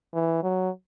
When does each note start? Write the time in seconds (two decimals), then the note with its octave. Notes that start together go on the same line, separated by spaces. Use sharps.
0.14 E3
0.43 F#3